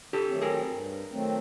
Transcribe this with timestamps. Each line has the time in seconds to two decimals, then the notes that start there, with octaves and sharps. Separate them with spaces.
0.13 G4 A4
0.28 D#3 F#3 A3 C4
0.42 G#4 A#4
0.69 G2
1.11 D#3 F#3 A3 C4